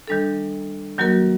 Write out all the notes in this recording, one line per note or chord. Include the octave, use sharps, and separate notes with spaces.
D#3 G3 D4 A4
D#3 F#3 A#3 F#4 A#4